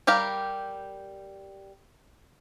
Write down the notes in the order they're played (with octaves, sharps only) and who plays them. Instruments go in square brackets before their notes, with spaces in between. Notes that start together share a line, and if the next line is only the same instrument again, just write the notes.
[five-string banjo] G3 G4 A#4 F5